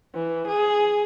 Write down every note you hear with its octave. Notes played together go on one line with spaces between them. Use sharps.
E3
G#4